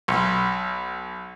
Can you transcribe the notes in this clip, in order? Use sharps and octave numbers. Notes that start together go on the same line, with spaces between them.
B1